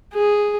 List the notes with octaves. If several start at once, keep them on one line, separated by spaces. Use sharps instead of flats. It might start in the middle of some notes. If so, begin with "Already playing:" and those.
G#4